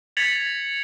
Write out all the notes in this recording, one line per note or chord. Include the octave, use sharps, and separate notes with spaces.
G#6 A6 B6 C#7 F7 F#7